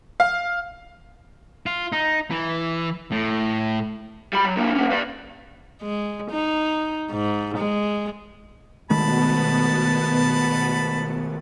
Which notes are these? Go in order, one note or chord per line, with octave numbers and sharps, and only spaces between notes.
F5
F4
D#4
E3
A2
G3 B5
F#3
D3 A#3
A#3 C#4
B4 D5
G#3
D#4
G#2
G#3
B2 D#3 G#3 A3 B3 A5 B5